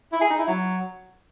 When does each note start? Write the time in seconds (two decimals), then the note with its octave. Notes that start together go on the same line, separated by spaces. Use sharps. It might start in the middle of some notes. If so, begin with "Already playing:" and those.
0.13 E4
0.21 G#4
0.30 D#4
0.39 E4
0.48 F#3